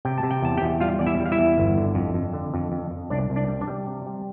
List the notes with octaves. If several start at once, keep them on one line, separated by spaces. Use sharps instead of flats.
C3 G5
A5
C3
G5
E2 A5
G4 G5
E2
G3 F4 F5
E2 D5
E4 E5
G3
F5
E4 E5
E2
G1
D3
F2
F2
D3
F2
F2
F2
C2 D4 D5
C2
D4 D5
G3
D4 D5
G3
C3
G3